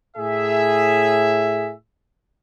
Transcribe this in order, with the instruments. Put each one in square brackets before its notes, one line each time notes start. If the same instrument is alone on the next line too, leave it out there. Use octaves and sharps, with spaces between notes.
[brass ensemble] A2 G#4 E5